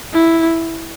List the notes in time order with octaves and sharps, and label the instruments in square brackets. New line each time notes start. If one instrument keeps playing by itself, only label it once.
[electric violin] E4